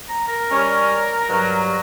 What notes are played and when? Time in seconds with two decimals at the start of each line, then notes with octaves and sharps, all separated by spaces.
0.09 A#5
0.28 A#4
0.51 G3 C#4
1.29 G2 F#3